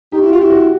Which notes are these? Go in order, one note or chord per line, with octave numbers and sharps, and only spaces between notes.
D#4 G4
E4
F#4
F4
E4 G4
F#4